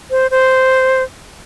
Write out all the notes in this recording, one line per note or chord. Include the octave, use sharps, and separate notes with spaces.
C5
C5